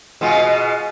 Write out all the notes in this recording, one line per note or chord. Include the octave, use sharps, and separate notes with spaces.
B2 G#3 F4